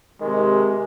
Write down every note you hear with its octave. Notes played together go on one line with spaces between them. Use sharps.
C3 D#3 G#3